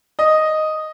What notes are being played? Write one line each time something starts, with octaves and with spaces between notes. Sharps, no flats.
D#5